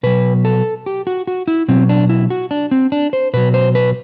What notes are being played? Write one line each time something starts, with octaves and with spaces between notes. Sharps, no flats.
B2 F#3 B4
A4
G4
F#4
F#4
E4
B2 F#3 C4
D4
E4
F#4
D4
C4
D4
C5
B2 F#3 B4
C5
B4